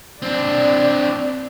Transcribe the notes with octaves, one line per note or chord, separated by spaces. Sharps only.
C4 D4 D5